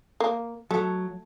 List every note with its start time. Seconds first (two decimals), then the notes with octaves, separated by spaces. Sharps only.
0.20 A#3
0.71 F#3 A3